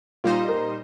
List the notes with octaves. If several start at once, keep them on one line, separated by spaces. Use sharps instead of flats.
A#2 G3 D#4 F4 C5 D#5
A#4